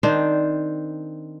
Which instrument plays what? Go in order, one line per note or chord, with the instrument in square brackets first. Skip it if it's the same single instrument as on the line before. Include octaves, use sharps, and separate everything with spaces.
[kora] D#3 C4 D4 C5